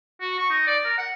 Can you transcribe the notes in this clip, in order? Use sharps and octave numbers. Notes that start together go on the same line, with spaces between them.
F#4
C#6
D#4
D5
A#4
F#5